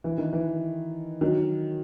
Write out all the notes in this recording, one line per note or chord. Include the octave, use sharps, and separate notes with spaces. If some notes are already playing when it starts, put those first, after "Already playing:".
E3
D#3
E3
D#3 F#3